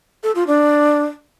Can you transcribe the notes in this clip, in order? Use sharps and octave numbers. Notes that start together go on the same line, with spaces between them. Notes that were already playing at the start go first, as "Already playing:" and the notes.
A4
F4
D4